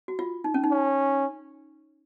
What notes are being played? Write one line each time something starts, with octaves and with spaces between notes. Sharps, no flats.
F#4
F4
D#4
C#4
D#4
C#4